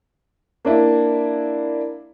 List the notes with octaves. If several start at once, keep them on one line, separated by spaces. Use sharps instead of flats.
A#3 D4 E4